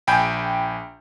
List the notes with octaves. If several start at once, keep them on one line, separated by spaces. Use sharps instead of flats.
A#1 G5 G#5 B5 G6 D7